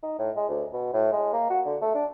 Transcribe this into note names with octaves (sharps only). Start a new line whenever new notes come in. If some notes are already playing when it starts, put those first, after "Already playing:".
D#4
A2
G#3
D2
B2
A2
G#3
A#3
F#4
D3
A3
D4